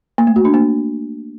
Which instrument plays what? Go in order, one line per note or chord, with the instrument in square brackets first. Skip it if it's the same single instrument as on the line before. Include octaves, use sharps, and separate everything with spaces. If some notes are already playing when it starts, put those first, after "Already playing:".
[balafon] A#3
A3
F#4
D4
A#3